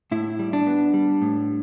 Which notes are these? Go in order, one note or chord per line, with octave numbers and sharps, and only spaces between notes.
A2 E4
G3
D4
B3
G3
A2